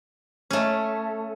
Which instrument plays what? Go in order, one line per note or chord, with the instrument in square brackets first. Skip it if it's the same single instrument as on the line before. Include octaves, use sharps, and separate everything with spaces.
[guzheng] A3 C#4